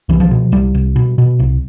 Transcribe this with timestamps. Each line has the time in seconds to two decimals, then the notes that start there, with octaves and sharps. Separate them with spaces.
0.09 C2 E3
0.20 F3
0.31 B2
0.52 C2 G3
0.75 C2
0.96 B2
1.18 B2
1.39 C2